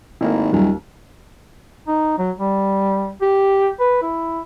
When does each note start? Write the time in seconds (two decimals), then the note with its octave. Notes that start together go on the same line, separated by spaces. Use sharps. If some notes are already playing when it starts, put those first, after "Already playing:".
0.21 G#1 D#3 A3 A#3 E4
0.53 D#1 D#2 F#3 G3
1.88 D#4
2.18 F#3
2.39 G3
3.22 G4
3.80 B4
4.02 E4